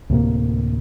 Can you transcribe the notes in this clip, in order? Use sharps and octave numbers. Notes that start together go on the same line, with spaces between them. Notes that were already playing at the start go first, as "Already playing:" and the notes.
D2 A2 C3 A#3